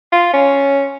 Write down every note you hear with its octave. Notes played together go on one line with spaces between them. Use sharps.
F4
C#4